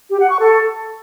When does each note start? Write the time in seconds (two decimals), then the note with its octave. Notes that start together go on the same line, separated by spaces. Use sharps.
0.10 G4
0.20 F#5
0.30 C#6
0.40 A4